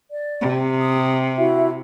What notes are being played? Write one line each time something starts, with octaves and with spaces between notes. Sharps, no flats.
D5
C3
D#6
E4 F#4 E5